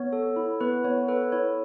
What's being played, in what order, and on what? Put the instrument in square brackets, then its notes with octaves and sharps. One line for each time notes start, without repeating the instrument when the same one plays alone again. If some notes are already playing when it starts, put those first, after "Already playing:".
Already playing: [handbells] B3 C#5
A4
E4
B3 B4
B3 C#5
A4 B4
E4 C#5